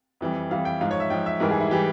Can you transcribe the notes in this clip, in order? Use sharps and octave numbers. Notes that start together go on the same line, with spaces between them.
F2 E3 G3
F2 E3 G3 F5
G5
G#2 F3 F5
C#5
E5
G#2 F3 G5
E5
G#2 E3 G3 A#4
G#4
E4
E3 G3 G4